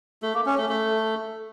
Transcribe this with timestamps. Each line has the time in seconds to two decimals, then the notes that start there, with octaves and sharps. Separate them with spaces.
0.22 A3
0.34 A#3
0.46 C#4
0.57 A3
0.69 A3